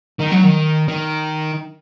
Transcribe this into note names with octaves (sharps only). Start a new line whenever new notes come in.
D#3
F#3
D#3
D#3